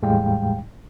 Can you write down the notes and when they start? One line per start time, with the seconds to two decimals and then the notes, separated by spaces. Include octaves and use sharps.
0.02 E2 A2 G3 G#3 F5 G5